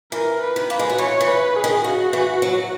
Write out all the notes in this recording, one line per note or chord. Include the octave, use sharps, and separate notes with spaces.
E3 A#4
B4
D#3
A#3 B4
G#3
F#3
E3 C#5
E3
B4
G#4
D#3
C#3 F#4
E3
F#3